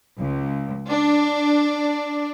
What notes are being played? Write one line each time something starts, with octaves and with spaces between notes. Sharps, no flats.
C#2
D4